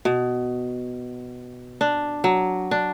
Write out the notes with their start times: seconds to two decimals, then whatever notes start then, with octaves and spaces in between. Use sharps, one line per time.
0.05 B2
1.81 D4
2.24 F#3
2.71 D4